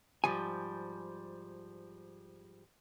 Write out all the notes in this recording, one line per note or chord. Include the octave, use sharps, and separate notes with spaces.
G#2 F3 G3 G#5